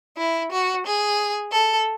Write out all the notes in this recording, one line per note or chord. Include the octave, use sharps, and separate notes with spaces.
E4
F#4
G#4
A4